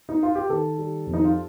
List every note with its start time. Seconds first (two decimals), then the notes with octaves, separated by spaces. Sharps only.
0.09 D#4
0.23 F4
0.35 G4
0.49 D#3 A4
0.78 G3
1.06 F2
1.13 D#4
1.24 F4